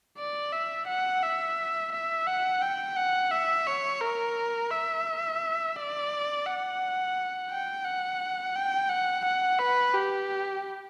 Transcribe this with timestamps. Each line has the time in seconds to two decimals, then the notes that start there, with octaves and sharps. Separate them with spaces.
0.18 D5
0.53 E5
0.87 F#5
1.23 E5
1.92 E5
2.27 F#5
2.62 G5
2.97 F#5
3.31 E5
3.67 C#5
4.01 A#4
4.71 E5
5.76 D5
6.46 F#5
7.50 G5
7.85 F#5
8.55 G5
8.89 F#5
9.24 F#5
9.59 B4
9.94 G4